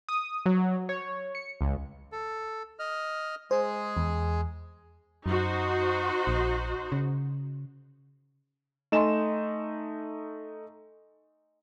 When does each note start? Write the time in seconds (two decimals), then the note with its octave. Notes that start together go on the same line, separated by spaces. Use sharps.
0.09 D#6
0.46 F#3
0.89 C#5
1.35 C#7
1.61 C#2
2.12 A4
2.79 D#5 F6
3.51 G#3 G#4 C5
3.97 E2
5.26 F#2 D#4 F#4 C5
6.27 A#1
6.92 C#3
8.92 A3 D#4 D#5 G#5 C6 E7